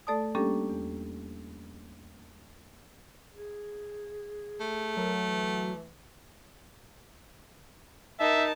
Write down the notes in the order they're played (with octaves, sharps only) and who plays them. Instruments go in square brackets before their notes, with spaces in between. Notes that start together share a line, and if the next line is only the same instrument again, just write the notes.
[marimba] A3 A4 D5 A5 D#6
G3 A#3 C#4 D4 G4 A4
E2
[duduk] G#4
[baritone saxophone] A3
[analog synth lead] F#3 [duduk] A#4
[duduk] E3
[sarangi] D#4 [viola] A#4 A5 [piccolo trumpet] E5